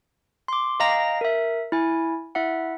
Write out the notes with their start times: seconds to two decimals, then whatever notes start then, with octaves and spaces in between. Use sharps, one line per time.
0.48 C6 D6
0.80 D#5 F5 G5 A#5 A#6
1.21 A#4 E5
1.72 E4 G#5
2.35 E4 E5 F#5